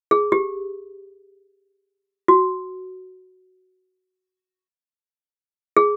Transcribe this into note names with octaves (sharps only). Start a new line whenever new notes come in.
G#4
G4
F#4
G#4